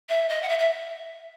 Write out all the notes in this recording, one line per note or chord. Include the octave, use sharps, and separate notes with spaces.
E5
D#5
F#5
E5
E5